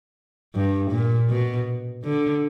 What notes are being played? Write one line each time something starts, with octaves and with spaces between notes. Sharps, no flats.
G2
A#2
B2
D3